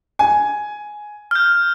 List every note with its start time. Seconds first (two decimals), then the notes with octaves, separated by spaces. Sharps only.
0.19 G#5
1.31 F6 G6